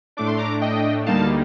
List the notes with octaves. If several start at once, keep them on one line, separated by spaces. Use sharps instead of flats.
A2 A3 D4 D6
C6
A#5 D6
D#5 G5
D2 D3 G3 A#3 D#4 F5 A5